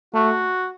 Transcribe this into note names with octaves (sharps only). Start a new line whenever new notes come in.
A3 F#4